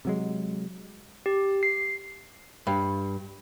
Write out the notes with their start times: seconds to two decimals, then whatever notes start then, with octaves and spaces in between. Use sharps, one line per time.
0.05 C3 F#3 G#3
1.26 G4
1.63 C7
2.67 G2